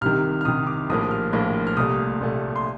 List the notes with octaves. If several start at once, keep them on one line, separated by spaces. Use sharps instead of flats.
C2 C3 D#3 F6
F6
C2 C3 D#3 D#6
D6
A#1 A2 F3 A#3 D#6
F6
A#1 A2 F3 A#3
F6
C2 A#2 A3 D#6
C2 A#2 A3
C6